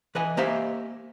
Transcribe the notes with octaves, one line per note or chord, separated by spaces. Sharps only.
E3 B4 D#5 G#5
A#3 G4 C5 D#5 E5 G#5